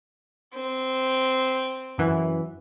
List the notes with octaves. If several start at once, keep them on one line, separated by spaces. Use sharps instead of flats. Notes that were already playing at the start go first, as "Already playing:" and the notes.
C4
F#2 E3